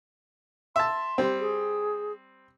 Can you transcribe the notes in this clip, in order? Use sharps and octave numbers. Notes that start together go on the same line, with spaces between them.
E5 A5 C6
G3 C4
G#4